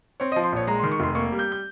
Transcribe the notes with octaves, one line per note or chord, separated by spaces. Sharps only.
C4 C#5
D#5
F3
C6
A#1 C#5
G#3 A#5
C6
D#3
C#6
F1 C6
A#3 C#6
G3
G6
G6